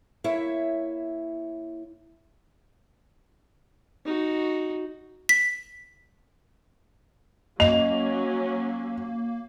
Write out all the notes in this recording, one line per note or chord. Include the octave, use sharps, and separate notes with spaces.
A#3 E4 C#5 E5
D#4 F#4
B6
F#3 A#3 C#4 D#5 F7